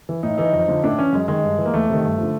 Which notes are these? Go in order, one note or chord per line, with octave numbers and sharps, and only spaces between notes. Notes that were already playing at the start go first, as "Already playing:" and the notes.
E3
A2 D#4
E3 D#4
F2
D3 F3
A2 D4
E3 C#4
F#2 G#3
D#3 G#3
G2
E3
A#3
E2 A3
C3 D#3
G2
D3 F3